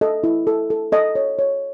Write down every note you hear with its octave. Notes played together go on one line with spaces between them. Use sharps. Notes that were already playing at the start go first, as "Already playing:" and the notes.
A4 D#5
E4
A4
A4
A4 D#5
C#5
C#5